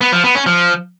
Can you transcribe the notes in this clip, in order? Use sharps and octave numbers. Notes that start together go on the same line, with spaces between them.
B3
F3
B3
C#4
F3